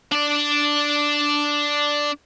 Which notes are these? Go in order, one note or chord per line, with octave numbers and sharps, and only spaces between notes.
D4 D5